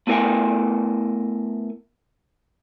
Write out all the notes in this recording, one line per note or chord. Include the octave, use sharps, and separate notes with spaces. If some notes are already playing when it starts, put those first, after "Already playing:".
A3 B3 E4 A#4 G5 G#5